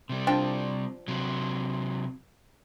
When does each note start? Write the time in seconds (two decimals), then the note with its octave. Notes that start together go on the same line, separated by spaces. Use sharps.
0.09 C3 G3
0.27 F3 D4 G5
1.08 C3 F#3